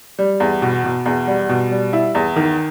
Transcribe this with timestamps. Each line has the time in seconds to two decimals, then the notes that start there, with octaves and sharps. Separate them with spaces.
0.19 G3
0.40 E2
0.62 B2
0.84 B2
1.06 E2
1.27 G3
1.49 B2
1.71 G3
1.93 E4
2.15 E2
2.36 D#3